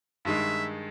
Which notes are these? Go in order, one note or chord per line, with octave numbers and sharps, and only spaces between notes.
G2 D#3 G#3 E5